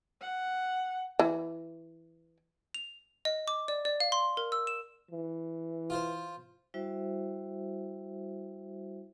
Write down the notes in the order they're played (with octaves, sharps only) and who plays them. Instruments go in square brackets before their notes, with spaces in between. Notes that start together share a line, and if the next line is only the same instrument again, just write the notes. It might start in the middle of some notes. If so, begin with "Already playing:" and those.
[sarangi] F#5
[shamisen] E3
[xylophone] F7
D#5
D6
D5
D5
F5
C6
A#4
E6
E7
[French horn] E3
[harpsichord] F4 C5
[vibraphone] G3 E4 F#4 C5 E5